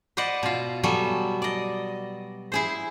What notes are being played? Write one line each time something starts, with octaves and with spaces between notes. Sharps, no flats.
B4 C5 D5 D#5 F#5
B2 F4
F#3 G3 B3 A4 G#5
D5 D#5
E4 G#4 C5